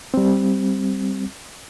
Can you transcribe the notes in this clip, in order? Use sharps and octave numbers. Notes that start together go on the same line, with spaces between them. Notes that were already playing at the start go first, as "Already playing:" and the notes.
G3 C4